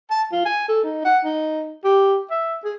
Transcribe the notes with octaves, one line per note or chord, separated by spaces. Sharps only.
A5
F4
G#5
A4
D#4
F#5
D#4
G4
E5
G#4